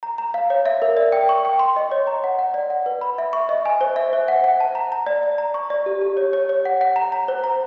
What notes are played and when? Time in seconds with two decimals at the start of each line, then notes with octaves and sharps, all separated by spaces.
0.03 A#5
0.18 A#5
0.34 F5
0.50 C#5
0.66 E5
0.82 A#4
0.97 D5
1.12 G5
1.29 C#6
1.45 G5
1.59 C6
1.76 D#5
1.92 C#5
2.07 A#5
2.24 F#5
2.39 F#5
2.54 D5
2.70 F#5
2.86 B4
3.01 B5
3.18 E5
3.33 C#6
3.49 D#5
3.66 G#5
3.81 C5
3.96 E5
4.13 C5
4.28 F#5
4.44 F#5
4.60 A5
4.75 A#5
4.92 A#5
5.06 D5
5.23 D5
5.38 A#5
5.54 C#6
5.70 D5
5.86 G4
6.01 G4
6.17 C#5
6.33 C#5
6.49 C#5
6.65 F#5
6.81 F#5
6.96 A#5
7.12 A#5
7.28 C5
7.44 A#5